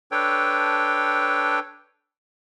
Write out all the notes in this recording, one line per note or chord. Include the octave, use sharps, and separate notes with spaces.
D4 A4 B4 C#5 G5